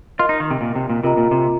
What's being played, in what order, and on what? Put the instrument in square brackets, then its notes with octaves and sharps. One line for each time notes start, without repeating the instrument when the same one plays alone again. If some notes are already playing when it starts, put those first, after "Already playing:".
[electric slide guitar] F4 [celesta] A#4 D#5 C6
[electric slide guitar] D#4
D#3
C3
A#2
C3
A#2
[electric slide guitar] C3 [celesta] F4 A#4 D#5 A#5
[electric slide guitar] A#2
C3